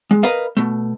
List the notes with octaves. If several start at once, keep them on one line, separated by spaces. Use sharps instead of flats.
G#3
A#4 B4 D#5 F5
B2 A3